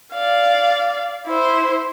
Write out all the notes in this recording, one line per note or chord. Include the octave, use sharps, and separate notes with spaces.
D5 F5
E4 C5